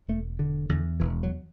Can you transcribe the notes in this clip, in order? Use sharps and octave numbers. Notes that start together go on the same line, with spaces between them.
E1 A3
D3
E2 D3
E1 E3
F#3